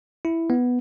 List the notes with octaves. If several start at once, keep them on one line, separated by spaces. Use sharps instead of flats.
E4
B3